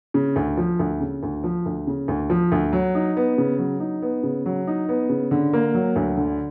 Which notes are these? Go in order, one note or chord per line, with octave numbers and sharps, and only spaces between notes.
C#3
D2
F3
D2
C#3
D2
F3
D2
C#3
D2
F3
D2
F#3
D#4
B3
C#3
F#3
D#4
B3
C#3
F#3
D#4
B3
C#3
D3
A#3
F#3
D2
D3